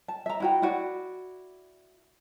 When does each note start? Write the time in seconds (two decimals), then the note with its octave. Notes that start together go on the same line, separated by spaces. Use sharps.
0.08 A5
0.26 E5 A#5
0.40 E4 F#4 G5
0.62 E4 F#4 D5